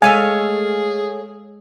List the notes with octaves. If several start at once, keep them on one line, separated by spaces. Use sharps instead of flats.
G#3 A3 G#4 C#5 F5 G#5 E6